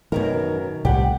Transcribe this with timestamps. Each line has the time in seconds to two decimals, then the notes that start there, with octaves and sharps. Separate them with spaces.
0.12 F#2 B2 D#3 A#4
0.85 C2 A2 G4 F#5